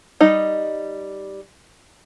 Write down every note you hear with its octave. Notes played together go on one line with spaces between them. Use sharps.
G3 D#4 D#5